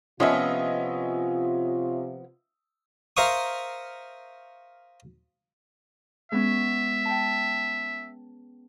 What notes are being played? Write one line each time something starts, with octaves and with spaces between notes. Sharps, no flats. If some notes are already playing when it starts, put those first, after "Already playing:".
C3 F3 B3 C#4 F4 D#5 E5
A#4 C5 E5 F5 C#6 D#6
G#3 B3 C#4 E5
G5 A5